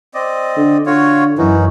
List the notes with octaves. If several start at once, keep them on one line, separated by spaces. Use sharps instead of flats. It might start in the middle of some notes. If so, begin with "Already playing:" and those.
C4 D5 D#5
D3
D3 F4 F#4 C#5
F#2 E3 C#4 D#4 F#4